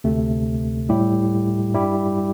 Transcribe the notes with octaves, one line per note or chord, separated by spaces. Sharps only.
D2 C3 A3
A2 G3 E4 G4
G2 G3 E4 G4